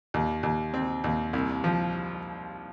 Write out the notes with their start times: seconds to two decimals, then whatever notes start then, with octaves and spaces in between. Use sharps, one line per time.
0.14 D#2
0.43 D#2
0.74 C4
1.04 D#2
1.33 C2
1.64 F3